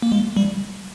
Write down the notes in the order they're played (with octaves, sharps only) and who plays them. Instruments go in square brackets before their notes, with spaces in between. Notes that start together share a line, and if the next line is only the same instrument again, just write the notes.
[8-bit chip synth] A#3
G#3
G3